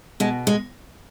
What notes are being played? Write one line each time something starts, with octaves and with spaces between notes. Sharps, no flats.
B2 G#3
G#3